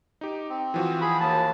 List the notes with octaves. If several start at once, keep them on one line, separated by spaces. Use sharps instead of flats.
D#4 G4
C4
E3 F3 F#4
G#4 B5
D#2 A5